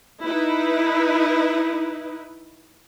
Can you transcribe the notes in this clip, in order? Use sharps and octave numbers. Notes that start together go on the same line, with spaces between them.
D#4 E4 B4